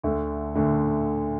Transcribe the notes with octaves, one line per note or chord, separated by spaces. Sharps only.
D2 D3 A3
D2 D3 A3